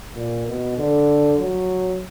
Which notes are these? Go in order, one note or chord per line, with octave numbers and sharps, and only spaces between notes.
A#2
B2
D3
F#3